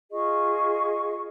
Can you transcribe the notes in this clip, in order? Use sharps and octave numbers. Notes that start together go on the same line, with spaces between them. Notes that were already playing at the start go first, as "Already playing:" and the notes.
F4 G#4 D#5 C#6